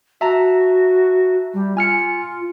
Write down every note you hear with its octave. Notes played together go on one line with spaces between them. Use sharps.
F#4 E5 A5 A#5
G3
F4 G#5 F6 C#7